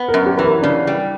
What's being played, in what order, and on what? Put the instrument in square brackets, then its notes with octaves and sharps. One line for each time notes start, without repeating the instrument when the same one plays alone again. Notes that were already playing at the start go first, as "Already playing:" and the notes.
Already playing: [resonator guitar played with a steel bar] B3
[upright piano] A#4
[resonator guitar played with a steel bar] F#2
[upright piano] G4
[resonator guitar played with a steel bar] E3 [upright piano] B4
[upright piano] A#4
[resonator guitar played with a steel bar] C#3 [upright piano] D4
[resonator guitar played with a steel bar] G3